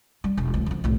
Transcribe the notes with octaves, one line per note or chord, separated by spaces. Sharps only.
G3
E1
D2 E3
D3 F3
B1 A2